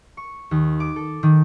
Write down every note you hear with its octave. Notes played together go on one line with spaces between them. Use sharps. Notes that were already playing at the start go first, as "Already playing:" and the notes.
C#6
D#2
D6
A4
D#3